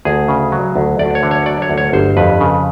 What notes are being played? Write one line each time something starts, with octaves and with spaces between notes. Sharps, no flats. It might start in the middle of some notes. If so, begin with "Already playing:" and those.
D2 G#4
C#3
F#3
D2
D2 D5
C#5
D3
C#5
F#3 D5
C#5
D2
C#5
G1 C5
F2 B4
C#3